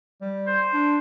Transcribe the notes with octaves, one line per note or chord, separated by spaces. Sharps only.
G3
C5
D4